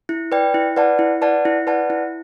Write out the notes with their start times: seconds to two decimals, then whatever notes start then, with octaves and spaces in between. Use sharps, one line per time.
0.09 E4
0.32 B4 D5 G5
0.54 E4
0.76 B4 D5 F#5 A5
0.99 E4
1.21 B4 D5 F#5 A5
1.45 E4
1.67 B4 D5 F#5 A5
1.90 E4